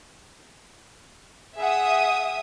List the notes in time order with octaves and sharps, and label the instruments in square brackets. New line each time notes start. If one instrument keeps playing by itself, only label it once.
[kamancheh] G#4 F#5 [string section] E5 D#6